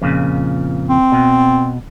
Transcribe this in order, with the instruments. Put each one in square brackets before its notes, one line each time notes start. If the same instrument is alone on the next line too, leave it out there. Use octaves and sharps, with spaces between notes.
[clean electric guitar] F2 A#2 C#3
[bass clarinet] C4
[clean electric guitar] B2